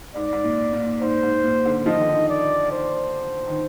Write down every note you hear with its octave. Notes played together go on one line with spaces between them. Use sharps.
G#2 D5
G#2
A#2
A#2
G#2 C5
G#2
A#2
D3
F3 D#5
D#3
D3
D#3
D5
C5
D#3